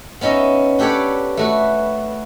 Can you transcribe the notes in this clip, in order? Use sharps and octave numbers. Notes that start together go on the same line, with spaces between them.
B3 C#4 D#4 D#5 E5
D4 G4 A4 B4 C#5 D5
A3 F#4 B4